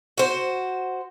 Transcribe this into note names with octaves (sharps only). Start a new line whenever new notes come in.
F#4 C5